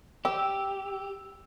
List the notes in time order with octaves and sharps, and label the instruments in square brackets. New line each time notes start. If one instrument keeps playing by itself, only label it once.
[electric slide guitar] G4 [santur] E6